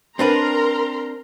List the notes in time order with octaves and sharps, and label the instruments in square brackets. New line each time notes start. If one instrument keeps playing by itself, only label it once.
[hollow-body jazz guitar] C4 D4 B4 [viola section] A#4 A#5 C6